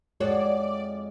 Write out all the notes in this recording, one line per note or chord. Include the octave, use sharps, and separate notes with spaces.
F2 G#3 F#4 C#5 D5